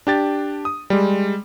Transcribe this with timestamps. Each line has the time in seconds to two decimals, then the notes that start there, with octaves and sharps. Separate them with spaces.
0.07 D4 G4 A6
0.65 D#6
0.90 G3 G#3